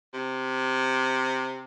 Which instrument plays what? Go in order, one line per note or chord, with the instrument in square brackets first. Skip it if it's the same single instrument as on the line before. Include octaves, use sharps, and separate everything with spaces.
[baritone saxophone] C3